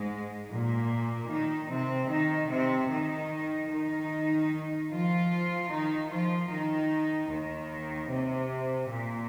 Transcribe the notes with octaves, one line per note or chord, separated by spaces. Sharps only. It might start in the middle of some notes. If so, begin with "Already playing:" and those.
Already playing: G#2 G#3
A#2 A#3
D#3 D#4
C3 C4
D#3 D#4
C3 C4
D#3 D#4
D#3 D#4
F3 F4
D#3 D#4
F3 F4
D#3 D#4
D#2 D#3
C3
A#2